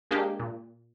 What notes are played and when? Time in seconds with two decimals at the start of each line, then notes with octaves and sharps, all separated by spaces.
0.11 G#3 A#3 D4 G4 G#4
0.39 A#2